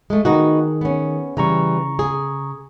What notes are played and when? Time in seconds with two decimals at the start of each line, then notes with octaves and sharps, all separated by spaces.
0.10 G#3 A3
0.25 D#3 B3 D#4 F#4 G#4
0.81 B3 C#4
1.37 C#3 E3 G3 A#5 C#6
1.99 G#4